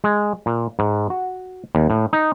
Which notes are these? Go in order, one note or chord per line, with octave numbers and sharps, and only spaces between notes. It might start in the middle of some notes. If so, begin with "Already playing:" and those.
G#3
A#2
G#2
F#4
D#2
A2
D#4